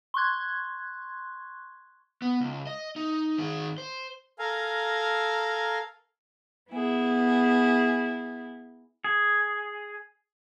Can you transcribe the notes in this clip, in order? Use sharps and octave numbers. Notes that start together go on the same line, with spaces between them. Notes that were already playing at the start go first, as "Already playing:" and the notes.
C6 C#6 F#6 G#6
B3
C#2
D#5
D#4
D#3 G#4
C5
A4 A#4 F5 G#5 A#5
B3 E4 G#4
G#4